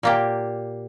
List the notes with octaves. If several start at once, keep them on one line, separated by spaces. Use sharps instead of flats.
A#2 A#3 G4